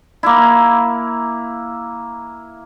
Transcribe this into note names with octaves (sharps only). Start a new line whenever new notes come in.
A#3 E4